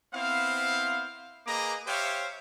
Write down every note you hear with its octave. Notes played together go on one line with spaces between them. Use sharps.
B3 C4 E4 C5 F5
A#3 G#4 B4 D#5 A#5 D6
G4 C5 C#5 E5 F5 G5